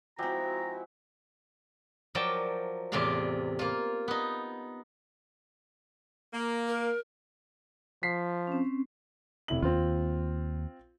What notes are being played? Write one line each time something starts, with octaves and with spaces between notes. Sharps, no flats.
F3 F#3 G#3 C4 E4 F#4 G4 A#5
F3 F#3 A#4 D5 G5 A5
E2 A2 C3 F4 D5 F5
A#3 F4
B3 D#4
A#3
A#4
F3 B6 C7
C4 C#4
F1 E4 F#7
D#2 C4 F4